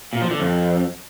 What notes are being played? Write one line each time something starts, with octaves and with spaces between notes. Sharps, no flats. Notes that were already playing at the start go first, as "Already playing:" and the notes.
A#2
F3
D3
F2